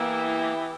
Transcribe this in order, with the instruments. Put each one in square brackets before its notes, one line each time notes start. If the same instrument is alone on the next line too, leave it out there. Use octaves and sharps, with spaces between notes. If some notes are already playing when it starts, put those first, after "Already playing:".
Already playing: [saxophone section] E3 B3 E4 G4 [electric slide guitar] A#3